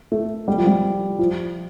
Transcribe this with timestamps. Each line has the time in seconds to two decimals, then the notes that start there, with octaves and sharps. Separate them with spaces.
0.12 A3
0.48 G3
0.57 F3
0.67 G3
1.19 F3